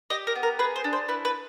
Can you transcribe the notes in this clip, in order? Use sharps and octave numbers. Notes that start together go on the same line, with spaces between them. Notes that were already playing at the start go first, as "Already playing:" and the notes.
G4 D#5
A#4
B3
A#4
G#4 B4
C5
D4
C5
E4 B4
B4